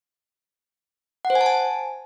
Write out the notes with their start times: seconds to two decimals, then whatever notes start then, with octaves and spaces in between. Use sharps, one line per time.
1.25 F#5
1.30 C5
1.35 G#5
1.41 A5
1.46 G#5